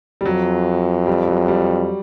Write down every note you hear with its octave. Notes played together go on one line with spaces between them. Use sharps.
G3
F2 F#3
G3
F#3
G3